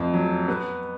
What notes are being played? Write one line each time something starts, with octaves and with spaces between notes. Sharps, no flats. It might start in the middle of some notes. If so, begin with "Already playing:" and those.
Already playing: F2 A3
F#3
B3